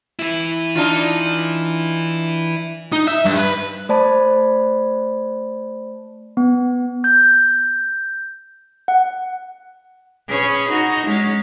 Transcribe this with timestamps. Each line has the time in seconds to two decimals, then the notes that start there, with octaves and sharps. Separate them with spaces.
0.19 E3 E4
0.75 D4 D#4 F4
2.93 D#4
3.08 E5
3.25 G2
3.37 B4
3.89 A3 C5 D5 A5 B5
6.37 B3
7.04 G6
8.88 F#5
10.29 C#4 G#4 B4
10.70 D#4 F#4
11.07 G#3 C#4